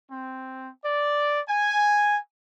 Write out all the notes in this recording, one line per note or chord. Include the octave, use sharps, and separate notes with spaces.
C4
D5
G#5